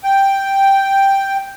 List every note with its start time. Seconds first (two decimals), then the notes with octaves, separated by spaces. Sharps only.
0.04 G5